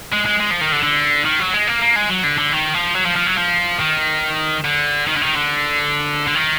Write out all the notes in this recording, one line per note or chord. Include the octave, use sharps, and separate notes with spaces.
G#3
G#3
G#3
F3
D#3
D3
D3
D#3
F#3
G#3
A#3
A#3
G#3
F#3
D3
D3
D#3
F3
F#3
F3
F3
F#3
F3
D#3
D3
D#3
D3
D#3
D3
D3
D#3